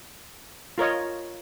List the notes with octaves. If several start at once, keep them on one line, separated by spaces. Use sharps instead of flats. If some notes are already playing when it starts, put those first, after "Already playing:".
F4 A#4 C#5 D#5